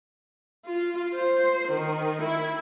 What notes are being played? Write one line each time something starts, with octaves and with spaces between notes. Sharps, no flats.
F4
C5
D#3
E4